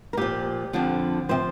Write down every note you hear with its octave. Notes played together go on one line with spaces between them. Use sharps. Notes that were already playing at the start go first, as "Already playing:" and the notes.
A#4
A#2 F3 G4
F2 D3 F3
C3 F3 C5